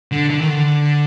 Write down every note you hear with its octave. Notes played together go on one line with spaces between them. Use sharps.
D3
D3
D#3
D3